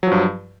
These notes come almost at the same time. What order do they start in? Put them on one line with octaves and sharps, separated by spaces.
F#3 F3 G2